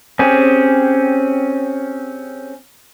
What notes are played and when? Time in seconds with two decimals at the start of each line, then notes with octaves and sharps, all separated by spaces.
0.19 C4 C#4 G4 G#4